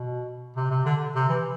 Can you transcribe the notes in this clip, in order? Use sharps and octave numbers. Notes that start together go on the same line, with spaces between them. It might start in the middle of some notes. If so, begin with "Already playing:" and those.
Already playing: B2
C3
C3
D3
C3
E3